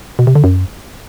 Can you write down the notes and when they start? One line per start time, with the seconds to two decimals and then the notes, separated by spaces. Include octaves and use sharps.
0.19 B2
0.27 C3
0.35 D3
0.44 F#2